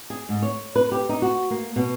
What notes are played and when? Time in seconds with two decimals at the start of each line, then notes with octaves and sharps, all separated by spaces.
0.10 G#4
0.29 G#2
0.42 C#5
0.76 B4
0.92 G4
1.09 D#4
1.22 F#4
1.51 A#3
1.76 B2